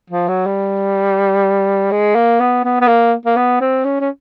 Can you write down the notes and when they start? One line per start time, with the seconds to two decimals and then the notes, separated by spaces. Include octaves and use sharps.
0.10 F3
0.28 F#3
0.46 G3
1.92 G#3
2.15 A#3
2.40 B3
2.65 B3
2.81 B3
2.88 A#3
3.26 A#3
3.37 B3
3.61 C4
3.85 C#4
4.01 C#4